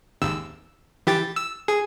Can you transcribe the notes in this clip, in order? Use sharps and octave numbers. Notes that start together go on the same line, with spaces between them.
G#1 D#2 E6
E3 G4 A6
E6
G#4